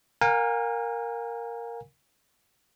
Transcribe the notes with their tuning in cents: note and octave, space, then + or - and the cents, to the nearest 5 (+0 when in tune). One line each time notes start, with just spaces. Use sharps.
A#4 +0 F5 +40 G#5 -35